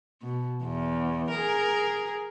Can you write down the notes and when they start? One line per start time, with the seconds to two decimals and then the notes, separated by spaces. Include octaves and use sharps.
0.22 B2
0.62 E2
1.31 G#4 A#4